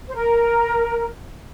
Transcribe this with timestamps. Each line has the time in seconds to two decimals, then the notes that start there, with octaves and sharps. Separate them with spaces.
0.08 C5
0.15 A#4